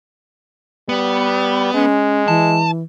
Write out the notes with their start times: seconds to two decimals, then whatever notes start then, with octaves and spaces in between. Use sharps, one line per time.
0.89 G3 B3
1.74 G#3 C#4
2.28 E3 A5